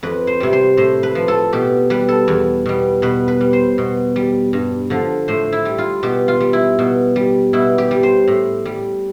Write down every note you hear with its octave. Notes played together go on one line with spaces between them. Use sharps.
F2 B4
C5
C3 G3
C5
A2 C5
B4
F3
A4
B2 G4
G3 B4
A4
E2
B2 G3
B2 B4
B4
G3
C5
B2
G3
G2
D3 F3
A2 C5
E4
G3
F4
B2 G4
F4
G3
E4
B2
G3
B2 E4
G4
G3
C5
A2
G3